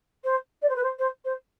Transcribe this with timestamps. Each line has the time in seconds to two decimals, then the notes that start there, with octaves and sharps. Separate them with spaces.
0.24 C5
0.62 D5
0.69 C5
0.75 B4
0.83 C5
0.98 C5
1.24 C5